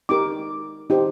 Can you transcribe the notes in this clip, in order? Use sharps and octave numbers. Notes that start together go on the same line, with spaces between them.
D#4 G4 A#4 D6
D#4 G4 C5